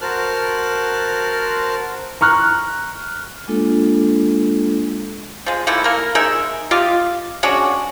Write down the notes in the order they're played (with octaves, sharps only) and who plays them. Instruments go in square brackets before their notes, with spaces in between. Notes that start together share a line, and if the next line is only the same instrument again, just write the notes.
[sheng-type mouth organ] F#4 A#4 C5 A5 F6 F#6
[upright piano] A#5 C#6 F6 F#6
[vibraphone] G#3 A#3 D4 F4 A4
[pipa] F3 G#3
D#3 A3 A#3 E4
A#3 A#4
G#3 D#4 A#4 E5
F4 G4 D#5 F5
G#3 C#4 D4 F#4